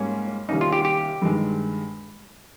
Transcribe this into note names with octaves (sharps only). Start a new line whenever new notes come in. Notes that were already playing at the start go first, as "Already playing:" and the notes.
Already playing: G#2 G3 A#3 C#4
C3 D#3 G3 A#3 C#4 D#4
F4
G4
G4
G2 D#3 G#3